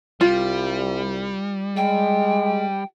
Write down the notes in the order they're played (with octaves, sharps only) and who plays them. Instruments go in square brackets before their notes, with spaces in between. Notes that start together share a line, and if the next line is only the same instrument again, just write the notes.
[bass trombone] C2 [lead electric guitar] G3 [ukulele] F4
[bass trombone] G#3 [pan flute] G5